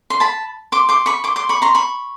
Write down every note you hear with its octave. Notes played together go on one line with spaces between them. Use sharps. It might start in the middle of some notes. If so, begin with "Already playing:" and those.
C6
A5 B5
C6 D6
C6 D6
B5 C#6
C6 D6
C6 D6
B5 C#6
A#5 C6
B5 C#6